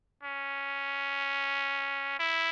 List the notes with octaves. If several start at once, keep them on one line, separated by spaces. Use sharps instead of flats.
C#4
E4